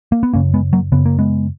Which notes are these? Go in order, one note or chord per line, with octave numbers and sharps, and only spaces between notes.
A#3
B3
F#2 C#3 A#3 C#4
G#3 B3
F#3 A#3
F#2 C#3 B3
A#3
G#3 B3